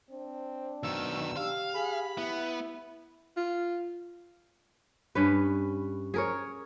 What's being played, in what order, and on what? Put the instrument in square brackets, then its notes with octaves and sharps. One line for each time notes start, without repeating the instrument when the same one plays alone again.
[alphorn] C4 [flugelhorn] D4
[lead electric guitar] B1 D#3 [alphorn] B2 [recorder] E6
[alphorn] G4 [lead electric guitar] F5
[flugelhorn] G#4 [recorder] B5
[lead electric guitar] B3 [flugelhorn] E4
[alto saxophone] F4
[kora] G2 C#4 B4
G#4 A#4 C#5